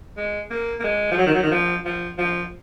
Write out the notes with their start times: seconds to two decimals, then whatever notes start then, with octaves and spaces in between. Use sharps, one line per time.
0.17 G#3
0.50 A#3
0.80 A#3
0.84 G#3
1.12 F3
1.18 F#3
1.26 D#3
1.34 F#3
1.43 D#3
1.51 F3
1.85 F3
2.18 F3